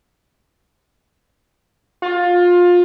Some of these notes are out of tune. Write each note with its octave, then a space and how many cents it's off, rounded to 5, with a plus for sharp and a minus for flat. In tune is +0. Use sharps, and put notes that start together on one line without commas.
F4 +20